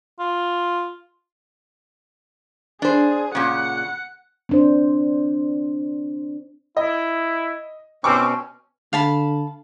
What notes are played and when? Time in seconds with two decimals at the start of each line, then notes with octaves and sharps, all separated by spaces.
0.19 F4
2.82 D4 G#4 C5
3.35 A#2 C#3 F#5
4.49 C4 D4 C5
6.77 E4 D#5
8.04 B2 C4 C#4 C#6 D6 E6
8.93 D3 F5 A5 B5